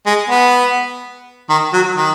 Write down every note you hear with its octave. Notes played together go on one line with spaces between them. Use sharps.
G#3
B3
D#3
F#3
D#3